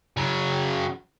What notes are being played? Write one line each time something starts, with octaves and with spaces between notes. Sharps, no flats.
C#3 F#3